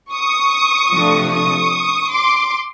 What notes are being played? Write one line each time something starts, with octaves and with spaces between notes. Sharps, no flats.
C#6 D#6
C3 F3 A3 D4
C#6 D#6
C6 D6